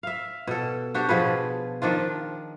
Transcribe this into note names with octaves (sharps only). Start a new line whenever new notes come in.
E5 F5
B2 A4
D4 F#4 G4
B2 F3 G#4 B4
D#3 F3 D4 F4